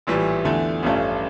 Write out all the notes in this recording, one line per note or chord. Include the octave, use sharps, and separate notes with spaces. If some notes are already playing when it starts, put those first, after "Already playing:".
A#1 A2 E3 G3
E2 D3 A3 E4
A1 G2 F3 A3 C#4